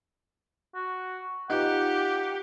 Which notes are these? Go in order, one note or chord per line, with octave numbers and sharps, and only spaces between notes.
F#4
D#4 F4 G4 B4 F#5